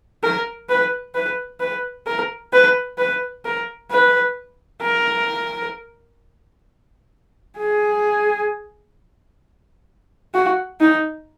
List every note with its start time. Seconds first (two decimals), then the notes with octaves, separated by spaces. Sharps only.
0.23 A#4
0.69 B4
1.14 B4
1.60 B4
2.07 A#4
2.53 B4
2.98 B4
3.45 A#4
3.91 B4
4.82 A#4
7.58 G#4
10.34 F#4
10.80 D#4